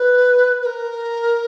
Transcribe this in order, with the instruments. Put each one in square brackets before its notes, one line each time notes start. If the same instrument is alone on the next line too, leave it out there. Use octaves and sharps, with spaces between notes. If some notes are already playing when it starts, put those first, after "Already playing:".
Already playing: [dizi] B4
B4
A#4